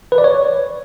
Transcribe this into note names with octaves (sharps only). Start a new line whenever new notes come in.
B4
D5
C#5